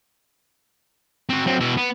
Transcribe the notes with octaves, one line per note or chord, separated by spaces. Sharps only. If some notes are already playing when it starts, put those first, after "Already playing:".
C4 F#4
F#3 C4
B2 E4
B3